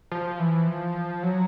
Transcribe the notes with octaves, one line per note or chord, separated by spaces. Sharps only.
F3
E3
F3
F#3